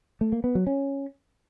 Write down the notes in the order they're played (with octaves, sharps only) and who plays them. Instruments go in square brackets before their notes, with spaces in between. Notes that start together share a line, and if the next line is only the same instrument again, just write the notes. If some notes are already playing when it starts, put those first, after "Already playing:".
[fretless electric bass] A3
A#3
B3
F#3
C#4